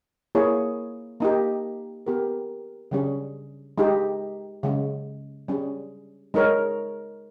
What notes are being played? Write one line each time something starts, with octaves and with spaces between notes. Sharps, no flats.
A#3 E4 G#4 C#5
A#3 D#4 G4
B3 G4 A#4
C#3 G3 C#4 G#4
G#3 D#4 G4
C#3 G#3 C#4
G3 C#4 G#4
G#3 D#4 A#4 C#5